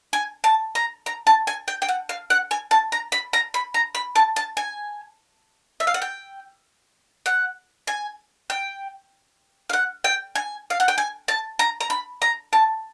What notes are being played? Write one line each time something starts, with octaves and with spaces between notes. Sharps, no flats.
G#5
A5
A#5
A#5
A5
G#5
G5
G5
F#5
F5
F#5
G#5
A5
A#5
B5
A#5
B5
A#5
B5
A5
A5
G#5
E5
F5
F#5
G5
F#5
G#5
G5
F5
F#5
G5
G#5
F5
F#5
G5
G#5
A5
A#5
A#5
B5
A#5
A5